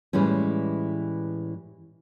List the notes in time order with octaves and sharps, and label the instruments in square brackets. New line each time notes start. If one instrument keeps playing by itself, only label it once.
[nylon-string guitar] A2 E3 G3 G#3 C#4